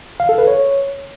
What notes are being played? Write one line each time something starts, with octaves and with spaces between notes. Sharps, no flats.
F5
A4
B4
C#5